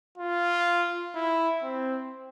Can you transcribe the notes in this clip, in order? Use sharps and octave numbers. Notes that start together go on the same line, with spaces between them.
F4
E4
C4